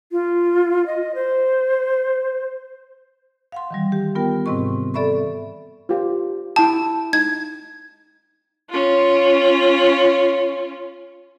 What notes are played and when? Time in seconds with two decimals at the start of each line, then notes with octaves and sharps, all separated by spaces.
0.12 F4
0.86 D#5
1.15 C5
3.52 F5 F#5 C6
3.70 D#3 E3 G3
3.92 G4
4.15 B3 F4 A#4 G5
4.46 G#2 C3 C4 D#5 C#6
4.94 A4 D5 E5 B5 C#6
5.89 F4 G4
6.56 E4 G5 A5
7.13 D#4 G#6
8.70 C#4 F4